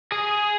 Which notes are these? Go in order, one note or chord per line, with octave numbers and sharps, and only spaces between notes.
G#4